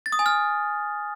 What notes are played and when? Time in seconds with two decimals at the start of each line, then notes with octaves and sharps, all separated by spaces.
0.06 A6
0.12 D#6
0.19 G#5
0.26 F6